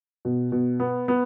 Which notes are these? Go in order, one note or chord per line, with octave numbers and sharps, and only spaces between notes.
B2
B2
B3
B3